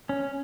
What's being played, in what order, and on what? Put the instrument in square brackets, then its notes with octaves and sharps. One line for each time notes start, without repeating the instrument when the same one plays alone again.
[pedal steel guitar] C#4